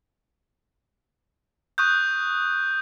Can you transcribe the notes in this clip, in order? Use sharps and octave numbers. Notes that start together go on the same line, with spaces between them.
C#6 D#6 F#6 G6